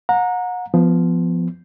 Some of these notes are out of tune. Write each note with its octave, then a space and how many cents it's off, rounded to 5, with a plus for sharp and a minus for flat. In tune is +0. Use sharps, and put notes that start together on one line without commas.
F#5 -35 A#5 +0
F3 -10 B3 +10